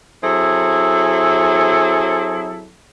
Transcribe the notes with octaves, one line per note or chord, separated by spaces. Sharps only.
F#3 C4 E4 G#4 A4